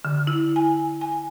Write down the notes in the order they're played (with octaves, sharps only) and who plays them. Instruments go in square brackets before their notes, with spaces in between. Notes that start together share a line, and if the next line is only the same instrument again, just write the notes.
[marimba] D3
E4
G#5
G#5